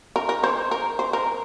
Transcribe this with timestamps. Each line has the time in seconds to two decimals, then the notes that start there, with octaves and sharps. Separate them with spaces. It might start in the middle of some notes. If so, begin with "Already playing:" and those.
0.16 A#4
0.29 A#4
0.44 C5
0.71 A#4
0.99 C5
1.13 A#4